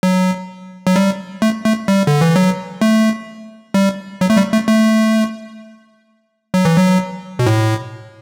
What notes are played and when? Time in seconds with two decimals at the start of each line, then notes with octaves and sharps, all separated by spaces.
0.03 F#3
0.87 F#3
0.96 G3
1.42 A3
1.66 A3
1.88 G3
2.07 D3
2.21 E3
2.36 F#3
2.81 A3
3.74 G3
4.21 F#3
4.30 A3
4.37 G3
4.53 A3
4.67 A3
6.54 F#3
6.65 E3
6.77 F#3
7.39 B2
7.47 A2